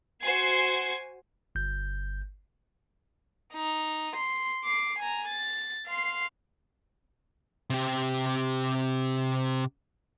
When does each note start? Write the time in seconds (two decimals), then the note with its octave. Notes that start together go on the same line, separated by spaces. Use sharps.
0.23 F#4 C5 G#5 G#6 C7
1.55 G1 G6
3.53 D#4
4.16 C6
4.65 D6 C7
4.99 G#5 A#5
5.28 A6
5.87 F5 C6
7.70 C3 G4